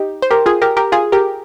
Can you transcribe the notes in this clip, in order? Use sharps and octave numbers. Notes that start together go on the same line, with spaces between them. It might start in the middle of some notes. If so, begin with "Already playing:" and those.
Already playing: D#4 G4
C5
G4 A#4
F4 G#4
G4 A#4
G4 A#4
F4 G#4
G4 A#4